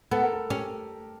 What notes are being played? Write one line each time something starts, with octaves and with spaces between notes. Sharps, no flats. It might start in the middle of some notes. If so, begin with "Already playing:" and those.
B3 A4
A#4
A4
C#4 G4